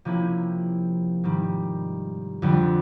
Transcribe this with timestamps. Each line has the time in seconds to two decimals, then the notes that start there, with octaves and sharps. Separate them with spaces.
0.05 C3 F3 A#3 C#4 E4
1.24 G#2 D#3 G3
2.42 F2 D3 G3